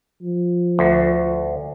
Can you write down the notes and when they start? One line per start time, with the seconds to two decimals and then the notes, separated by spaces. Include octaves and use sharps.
0.22 F3
0.79 D2